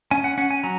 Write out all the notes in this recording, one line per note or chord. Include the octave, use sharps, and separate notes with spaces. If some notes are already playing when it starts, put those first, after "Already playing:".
C#4 G#5
F#5
C#4 F#5
G#5
F#3 A#5